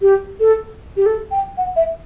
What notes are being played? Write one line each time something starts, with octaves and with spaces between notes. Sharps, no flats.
G4
A4
G4
A4
G5
F#5
E5